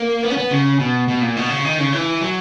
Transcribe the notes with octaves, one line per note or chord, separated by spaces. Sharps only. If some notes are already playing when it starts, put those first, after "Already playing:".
Already playing: A#3
B3
C#4
B3
C#3
B2
B2
A#2
B2
C#3
D#3
C#3
E3
F#3